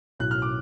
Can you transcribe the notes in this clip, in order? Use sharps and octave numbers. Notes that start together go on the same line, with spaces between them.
B1 A2 F#6
F6
D6